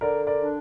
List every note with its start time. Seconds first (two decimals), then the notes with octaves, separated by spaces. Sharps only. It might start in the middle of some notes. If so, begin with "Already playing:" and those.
0.01 D3 A#4 D5
0.27 A#4 D5
0.40 D4